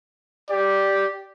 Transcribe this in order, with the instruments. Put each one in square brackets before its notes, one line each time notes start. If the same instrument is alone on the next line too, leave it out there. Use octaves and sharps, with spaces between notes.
[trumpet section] G4 D5